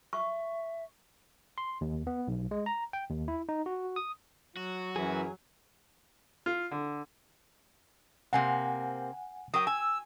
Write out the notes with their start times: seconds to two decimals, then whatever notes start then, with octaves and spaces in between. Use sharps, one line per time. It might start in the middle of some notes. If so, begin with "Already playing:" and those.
0.13 E5 C#6
1.58 C6
1.81 D#2
2.07 B3
2.28 B1
2.51 G#3
2.66 A#5
2.93 G5
3.09 D#2
3.28 E4
3.49 D#4
3.66 F#4
3.96 D#6
4.57 F#3 F#4
4.96 F#2 E3 G#4
6.46 F4
6.71 D3
8.33 C3 A#3 C4 F#5 G#5
9.54 F#3 A#4 G5 D#6
9.67 G#5 E6